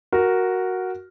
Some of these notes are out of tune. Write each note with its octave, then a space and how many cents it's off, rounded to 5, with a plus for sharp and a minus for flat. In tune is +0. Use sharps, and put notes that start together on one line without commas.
F#4 +0 A#4 +0